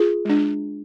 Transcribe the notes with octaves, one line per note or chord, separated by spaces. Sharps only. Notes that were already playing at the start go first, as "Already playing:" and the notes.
Already playing: F4 G#4
G#3 D4